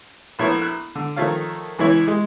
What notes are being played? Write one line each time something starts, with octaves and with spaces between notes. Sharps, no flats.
A#1 A3 B3 E4 C#5
F#6
D3
D#3 F3 A3 C#5 F5
C#2 E3 E4 C#5
G#3